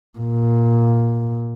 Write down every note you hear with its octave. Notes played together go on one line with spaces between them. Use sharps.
A#2